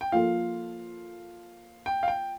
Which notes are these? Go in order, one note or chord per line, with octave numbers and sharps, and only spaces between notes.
G5
F3 A#3 F4 A4 F5
G5
F5
G5